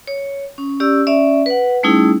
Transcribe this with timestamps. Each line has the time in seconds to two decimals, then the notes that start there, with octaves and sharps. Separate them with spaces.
0.08 C#5
0.58 C#4
0.80 C#4 G4 D5 E6
1.07 C#4 D5 E5
1.46 B4 F#5
1.83 G3 A3 C#4 D#4 E4 G#4